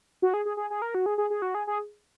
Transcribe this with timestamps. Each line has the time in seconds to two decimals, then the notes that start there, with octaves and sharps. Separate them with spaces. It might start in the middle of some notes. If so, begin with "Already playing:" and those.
0.22 F#4
0.34 G#4
0.45 G#4
0.57 G#4
0.70 G#4
0.82 A#4
0.95 F#4
1.06 G#4
1.18 G#4
1.30 G#4
1.42 F#4
1.55 G#4
1.67 G#4